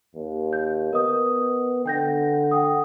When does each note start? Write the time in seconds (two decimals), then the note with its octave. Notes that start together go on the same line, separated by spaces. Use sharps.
0.15 D#2
0.53 G6
0.93 B3 A#4 D#5 D#6
1.86 D3 G5 G6 A#6
2.51 F#5 G5 D#6